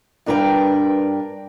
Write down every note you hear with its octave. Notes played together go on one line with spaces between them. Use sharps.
G2 D4 A#4 B4 G5